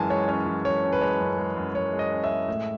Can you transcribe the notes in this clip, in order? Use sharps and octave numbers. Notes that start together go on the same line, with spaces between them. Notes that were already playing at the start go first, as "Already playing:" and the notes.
Already playing: F#2 E3 G#3 G#5 A5
G#3 C#5
C#4 C#5
E3
F#2 C#5
C#4
B4
G#3 C#5
F#2
G#3
F#2
F#2 C#5
G#3
D#5
C#4
E5
G#3
A2